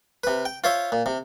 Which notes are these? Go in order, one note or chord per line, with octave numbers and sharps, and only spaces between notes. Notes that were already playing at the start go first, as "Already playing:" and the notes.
C3 B4
G5
F4 C5 C#5 E5
A#2
C3